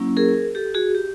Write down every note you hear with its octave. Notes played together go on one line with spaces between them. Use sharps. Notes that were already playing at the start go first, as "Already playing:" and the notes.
Already playing: F#3 A#3 C#4 E4
G#4 A#4
G4 A4
F#4 G#4
G4